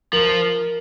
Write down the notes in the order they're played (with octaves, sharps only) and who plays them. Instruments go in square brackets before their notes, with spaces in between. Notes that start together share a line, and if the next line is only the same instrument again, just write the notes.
[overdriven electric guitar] F3 [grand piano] A#4